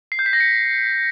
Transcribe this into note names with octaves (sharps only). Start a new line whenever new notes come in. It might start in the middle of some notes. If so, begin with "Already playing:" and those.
C7
G6
B6
A#6
C#7